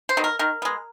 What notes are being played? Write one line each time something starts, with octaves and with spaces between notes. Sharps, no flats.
C5
D#3 F#3 B3
A#4
D#3 A#4
G#3 B3